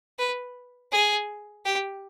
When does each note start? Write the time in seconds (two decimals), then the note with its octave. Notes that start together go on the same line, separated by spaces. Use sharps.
0.18 B4
0.92 G#4
1.65 G4